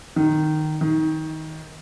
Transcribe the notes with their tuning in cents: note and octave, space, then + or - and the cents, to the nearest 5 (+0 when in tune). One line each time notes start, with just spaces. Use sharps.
D#3 -10
D#3 +20